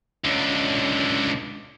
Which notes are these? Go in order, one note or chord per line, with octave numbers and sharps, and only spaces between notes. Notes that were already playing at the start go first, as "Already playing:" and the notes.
C#2 D3